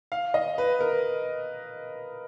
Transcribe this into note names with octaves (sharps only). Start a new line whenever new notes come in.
F5
D#5
B4
A#4